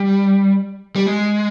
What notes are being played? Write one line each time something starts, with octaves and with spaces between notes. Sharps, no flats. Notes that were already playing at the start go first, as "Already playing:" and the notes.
Already playing: G3
G3
G#3